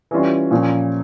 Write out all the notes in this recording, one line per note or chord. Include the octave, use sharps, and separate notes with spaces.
E3 G3 C#4 F4
A#2 F3 A#3 C#4